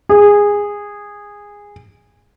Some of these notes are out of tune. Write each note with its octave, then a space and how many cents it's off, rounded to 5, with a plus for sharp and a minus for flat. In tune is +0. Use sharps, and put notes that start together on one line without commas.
G#4 -15